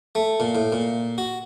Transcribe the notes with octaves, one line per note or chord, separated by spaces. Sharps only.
A3
A#2
A2
A#2
F#4